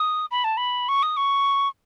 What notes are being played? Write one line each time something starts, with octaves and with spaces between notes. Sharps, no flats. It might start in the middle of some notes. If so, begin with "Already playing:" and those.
Already playing: D#6
B5
A5
B5
C#6
D#6
C#6